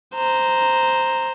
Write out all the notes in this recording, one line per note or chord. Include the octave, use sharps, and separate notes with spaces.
C5 A#5